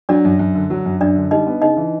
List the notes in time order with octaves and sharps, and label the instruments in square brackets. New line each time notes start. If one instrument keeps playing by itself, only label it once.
[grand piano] F#3 [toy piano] D4 D5
[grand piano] F#2
F#2
D3
F#3
F#2
[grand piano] F#2 [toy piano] D4 D5
[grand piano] D3
[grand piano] G3 [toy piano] D#4 D#5
[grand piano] B3
[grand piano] C#3 [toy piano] D#4 D#5
[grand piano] E3